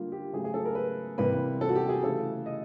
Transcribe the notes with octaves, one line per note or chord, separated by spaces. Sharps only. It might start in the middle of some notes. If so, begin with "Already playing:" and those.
Already playing: D3 G3 A#3 F4
G4
C#3 F#3 A3 G#4
G#4
A4
A#4
B4
C3 E3 G3 A#3 B4
A4
F#4
G4
G#4
C#3 E3 A3 A4
D#5